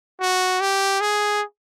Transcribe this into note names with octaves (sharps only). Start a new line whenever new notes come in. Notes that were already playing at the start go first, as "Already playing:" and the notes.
F#4
G4
G#4